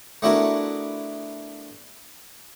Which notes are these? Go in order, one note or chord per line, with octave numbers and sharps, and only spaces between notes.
A3 B3 D4 E4 F#4 A#4